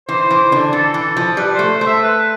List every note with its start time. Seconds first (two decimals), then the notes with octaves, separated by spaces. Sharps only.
0.08 E3 C5
0.31 E3
0.52 D3
0.73 E3 A4
0.94 E3
1.17 F3
1.37 G3 B4
1.54 A3 C5
1.69 C5
1.81 A3
1.86 E5
2.02 B4